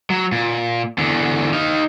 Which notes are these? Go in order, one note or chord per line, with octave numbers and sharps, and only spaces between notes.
F#3
A#2
E2 D3
D#4 F5